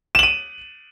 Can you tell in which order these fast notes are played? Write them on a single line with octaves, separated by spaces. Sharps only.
E7 F#7 D#7